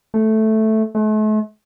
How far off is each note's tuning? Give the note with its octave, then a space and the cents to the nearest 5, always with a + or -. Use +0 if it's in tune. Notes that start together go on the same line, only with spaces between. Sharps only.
A3 -5
A3 -40